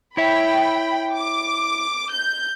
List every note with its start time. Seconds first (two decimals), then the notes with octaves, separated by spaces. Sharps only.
0.17 E4 C#5 E5 G5 B5
1.13 D6
2.12 G6